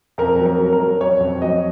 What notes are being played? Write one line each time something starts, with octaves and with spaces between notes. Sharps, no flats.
F2 A#4
F#3
A#4
F#3
A#4
F#3
F2 C#5
F2
F#3 D#5